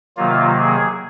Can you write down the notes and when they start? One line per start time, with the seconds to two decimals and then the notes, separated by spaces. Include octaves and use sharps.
0.17 C3 D#3 F#3 A#3 F4
0.59 G#4